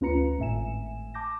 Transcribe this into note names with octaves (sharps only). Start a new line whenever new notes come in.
D2 C#4 F4 B4 A#5 C#7
G#1 A2 E5 G#5 E7
A5 D6 G6 A#6